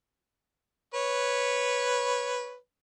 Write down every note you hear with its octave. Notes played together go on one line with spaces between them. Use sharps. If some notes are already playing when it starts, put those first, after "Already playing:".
B4 C#5